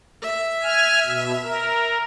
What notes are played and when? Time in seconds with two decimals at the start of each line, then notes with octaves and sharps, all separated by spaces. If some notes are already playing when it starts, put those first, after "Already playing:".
0.22 E5
0.63 G#5 F6
1.06 B2
1.43 A#4